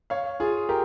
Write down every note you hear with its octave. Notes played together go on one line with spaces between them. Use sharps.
C#5 F5
F4 G#4
G4 A#4